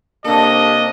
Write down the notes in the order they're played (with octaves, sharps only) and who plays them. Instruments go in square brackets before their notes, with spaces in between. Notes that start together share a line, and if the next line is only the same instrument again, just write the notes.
[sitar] C3 A4 [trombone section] A#3 D4 [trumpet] D#5